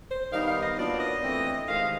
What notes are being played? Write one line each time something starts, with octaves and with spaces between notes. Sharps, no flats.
C5
D#3 G3 B3 D#4 F5
F5
D#5
A#2 F#3 B3 D4 F4 D5
D#5
E3 A3 C4
C3 D#3 G#3 F5